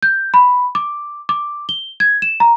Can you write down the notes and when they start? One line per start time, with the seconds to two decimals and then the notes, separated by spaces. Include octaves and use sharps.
0.03 G6
0.34 B5
0.75 D6
1.29 D6
1.69 G7
2.00 G#6
2.22 E7
2.40 A#5